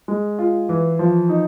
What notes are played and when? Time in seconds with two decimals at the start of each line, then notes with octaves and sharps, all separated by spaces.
0.08 G#3
0.39 F4
0.69 E3
0.99 F3
1.29 D#4